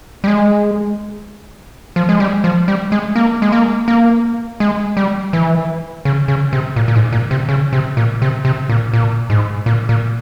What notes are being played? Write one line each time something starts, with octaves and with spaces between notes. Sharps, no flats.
G3
G#3
F3
G#3
G3
F3
G3
G#3
A#3
G#3
A#3
A#3
G#3
G3
E3
C#3
C#3
C3
A#2
A#2
G#2
A#2
C3
C#3
C3
A#2
C3
C3
A#2
A#2
G#2
A#2
A#2